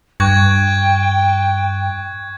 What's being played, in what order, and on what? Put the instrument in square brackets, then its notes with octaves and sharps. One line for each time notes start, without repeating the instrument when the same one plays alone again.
[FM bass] G2 [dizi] G5 [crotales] C#6 F#6 G#6